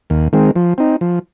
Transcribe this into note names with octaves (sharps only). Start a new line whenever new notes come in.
D#2
D#3 G#3 C4
F3
C4 D#4
F3